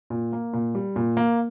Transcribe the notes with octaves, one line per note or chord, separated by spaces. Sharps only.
A#2
A#3
A#2
G3
A#2
A#3